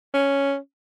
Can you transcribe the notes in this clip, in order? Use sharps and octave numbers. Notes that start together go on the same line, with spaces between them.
C#4